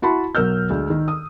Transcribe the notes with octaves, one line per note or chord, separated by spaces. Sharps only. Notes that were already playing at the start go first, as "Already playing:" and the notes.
E4 F#4 A5 B5 C6
B1 F#3 A#4 E6 F6 G6
D2 G#3
D#3
D#6